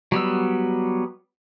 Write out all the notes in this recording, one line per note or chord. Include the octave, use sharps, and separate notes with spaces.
F#3 G3 B3 E6